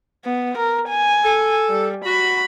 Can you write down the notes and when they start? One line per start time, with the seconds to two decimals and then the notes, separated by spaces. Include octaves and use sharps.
0.25 B3
0.58 A#4
0.90 G#5
1.24 A4
1.70 G3
2.05 F#4 B5